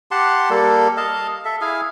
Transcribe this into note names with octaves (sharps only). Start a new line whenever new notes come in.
G4 F#5 A5 C6
G3 A#3 A4
D#5 F5 A5
A4 E5
E4 G#4 F5 G#5